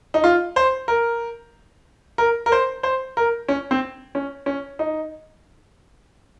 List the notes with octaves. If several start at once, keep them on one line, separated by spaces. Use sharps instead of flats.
D#4
F4
C5
A#4
A#4
A#4
C5
C5
A#4
C#4
C4
C#4
C#4
D#4